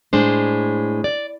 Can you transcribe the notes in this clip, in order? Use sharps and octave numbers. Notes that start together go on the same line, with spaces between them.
A2 G#3 D4 C5
D5